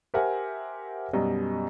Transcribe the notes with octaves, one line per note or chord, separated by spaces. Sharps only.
G4 A#4 C5 E5 F#5 G#5
F#2 B2 G3 D#5